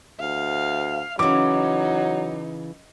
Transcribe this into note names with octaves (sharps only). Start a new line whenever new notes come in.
D2 F5
C#3 E3 F#3 D#4 D6